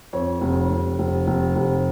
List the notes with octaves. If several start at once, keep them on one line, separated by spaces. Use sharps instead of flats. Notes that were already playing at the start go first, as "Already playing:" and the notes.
F2 C#5
F1
F1
F1
F1
F1